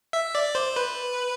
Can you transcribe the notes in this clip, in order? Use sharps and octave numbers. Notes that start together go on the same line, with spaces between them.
E5
D5
C5
B4